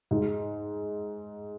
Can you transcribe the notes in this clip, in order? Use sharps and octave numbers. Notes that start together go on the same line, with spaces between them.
G#2